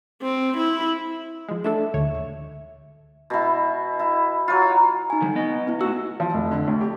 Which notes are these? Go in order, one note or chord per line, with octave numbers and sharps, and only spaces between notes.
C4
E4
F3 G#3
A3 D4 A4 E5
D2 C#5
B2 E4
E4
F#3 F4
D#4 G#5
D3 D#3 G3
B3 D#5
B3 E4
A2 F#4 E6
F3
F1
D3
D2
G4